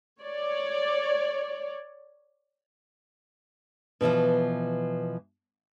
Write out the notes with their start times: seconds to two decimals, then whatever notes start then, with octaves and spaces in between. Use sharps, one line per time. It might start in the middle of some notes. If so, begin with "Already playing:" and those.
0.20 C#5 D5
4.01 B2 D3 E3 F3